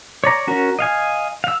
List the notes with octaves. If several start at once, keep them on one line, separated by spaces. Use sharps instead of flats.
C#5 D5 A#5
C#4 F#4 A#4
D#5 F5 G#5
F5 E6